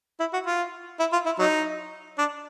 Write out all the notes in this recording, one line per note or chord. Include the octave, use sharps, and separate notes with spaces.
E4
F#4
F4
E4
F4
E4
F#3 D#4
D4